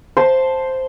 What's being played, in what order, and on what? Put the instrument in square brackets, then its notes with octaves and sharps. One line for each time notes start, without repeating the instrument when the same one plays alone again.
[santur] C5 A5